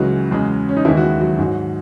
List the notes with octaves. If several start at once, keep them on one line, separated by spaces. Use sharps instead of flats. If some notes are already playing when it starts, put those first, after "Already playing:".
Already playing: C#2 C#3 E3 F#3 G#3 F#4
E2 C#3 G#3
C#4
D#4
D#2 D#3 E3 G#3 E4
F#4
E3 E4
F#3 F#4
G#2 F#3